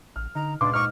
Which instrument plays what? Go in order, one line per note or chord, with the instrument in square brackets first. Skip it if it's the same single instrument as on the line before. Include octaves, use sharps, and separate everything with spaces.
[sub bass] A1 [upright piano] F6
[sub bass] D3 [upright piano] D#4 [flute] A#5
[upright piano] C#2 B4 C6 [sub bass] A#2 [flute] D4 [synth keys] D6
[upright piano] G#2 D#4 D6 [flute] C#6 [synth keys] F6